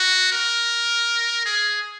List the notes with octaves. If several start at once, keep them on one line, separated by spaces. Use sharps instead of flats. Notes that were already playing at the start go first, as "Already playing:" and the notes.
Already playing: F#4
A#4
G#4